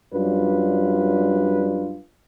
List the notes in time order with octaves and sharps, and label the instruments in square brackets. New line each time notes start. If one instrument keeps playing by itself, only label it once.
[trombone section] F#2 G3 D4 F4 B4